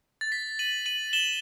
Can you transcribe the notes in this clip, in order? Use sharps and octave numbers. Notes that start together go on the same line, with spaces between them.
A6
B6
D#7 F#7
D#7 F#7
E7 G7